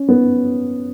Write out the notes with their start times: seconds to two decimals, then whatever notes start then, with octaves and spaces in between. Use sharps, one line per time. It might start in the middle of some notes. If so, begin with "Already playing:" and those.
Already playing: C#4
0.09 B3